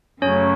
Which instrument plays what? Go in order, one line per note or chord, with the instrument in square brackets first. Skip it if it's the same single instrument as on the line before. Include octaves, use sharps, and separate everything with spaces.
[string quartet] F#2 C#3 F#3 A3 [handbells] C#4 C#5